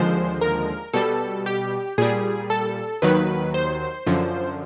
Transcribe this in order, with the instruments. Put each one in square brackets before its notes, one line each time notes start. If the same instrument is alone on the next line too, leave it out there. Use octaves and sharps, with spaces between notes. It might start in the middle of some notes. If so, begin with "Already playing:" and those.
Already playing: [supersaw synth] D#2 D3 F3 G#3 C5
A#4
B2 G3 A4
G4
A#2 G3 G#4
A4
D#2 D#3 F#3 B4
C5
F#2 D3 F3